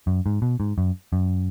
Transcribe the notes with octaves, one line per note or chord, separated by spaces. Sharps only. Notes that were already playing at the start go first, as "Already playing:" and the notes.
F#2
G#2
B2
G#2
F#2
F#2